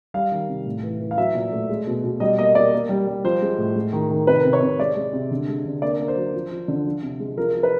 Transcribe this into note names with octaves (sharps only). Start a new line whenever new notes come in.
G3 F5
D#3
C3
A2
E3
E3
F5
F#3 E5
A#2
A3
G#3
B2
B2
G3 D#5
A#3 D#5
A#3 D5
A#3
G3
G3
F3 C5
G#3
A2
G#3
D#3
D#3
C3 B4
C3
C#5
C3
G#3 D5
G#3
C3
D3
G#3
D3
A#3 D5
A#3
C5
F#3
F3
F3
D3
F3
C3
G#3
F3 A#4
F3
B4